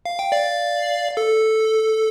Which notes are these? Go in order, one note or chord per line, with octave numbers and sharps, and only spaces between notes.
F5
G5
D5 F5
A4